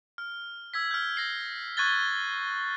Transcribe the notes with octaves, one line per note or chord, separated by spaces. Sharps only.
F6
E6 G#6 B6
F6 G6
A#6 C7
C#6 F#6 G#6 A6 G7